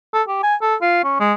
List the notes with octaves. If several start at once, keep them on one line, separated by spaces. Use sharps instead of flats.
A4
G4
G#5
A4
F4
C#4
G#3